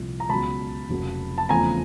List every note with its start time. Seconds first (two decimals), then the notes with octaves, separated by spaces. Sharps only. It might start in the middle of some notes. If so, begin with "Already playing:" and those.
Already playing: C2 A#2 F3
0.20 A#5
0.29 C#2 B2 F#3 A5 B5
0.90 F1 F2 C#3 F#3 A#3
1.38 A5
1.49 E2 C#3 F3 A3 C4 G#5 A#5